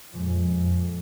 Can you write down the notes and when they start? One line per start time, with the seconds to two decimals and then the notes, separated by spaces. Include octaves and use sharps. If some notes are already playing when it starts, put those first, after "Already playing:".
0.13 F2 A#2 F3 G#3
0.49 F2